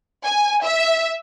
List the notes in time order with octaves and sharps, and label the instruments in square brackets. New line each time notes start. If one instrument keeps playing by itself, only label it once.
[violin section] G#5
E5